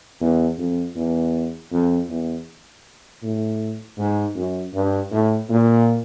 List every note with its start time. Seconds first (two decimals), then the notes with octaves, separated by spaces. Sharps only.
0.21 E2
0.58 F2
0.96 E2
1.72 F2
2.09 E2
3.23 A2
3.98 G#2
4.35 F#2
4.74 G2
5.12 A2
5.49 A#2